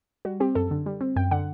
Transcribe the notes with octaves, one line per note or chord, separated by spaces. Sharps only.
G3 F#4
C4 G4
F#2 A4
D3
G3
C4
F#2 G5
D3 F#5